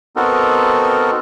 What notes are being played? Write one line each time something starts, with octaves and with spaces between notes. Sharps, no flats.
B3 C4 D#4 F#4 A4 A#4